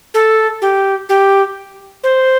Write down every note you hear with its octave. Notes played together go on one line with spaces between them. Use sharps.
A4
G4
G4
C5